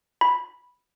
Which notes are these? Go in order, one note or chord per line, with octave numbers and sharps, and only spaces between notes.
B5